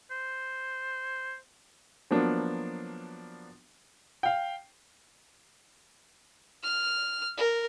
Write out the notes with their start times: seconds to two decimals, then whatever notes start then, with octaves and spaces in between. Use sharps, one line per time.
0.11 C5
2.11 F3 F#3 A#3 B3 D4
4.23 F5 G5
6.63 F6
7.37 A#4